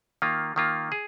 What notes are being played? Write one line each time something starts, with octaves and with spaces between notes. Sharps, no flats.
D#3 A#3 F4
D#3 A#3 F4
G#4